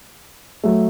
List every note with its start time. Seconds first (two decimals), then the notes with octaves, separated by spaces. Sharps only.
0.64 F#3 A3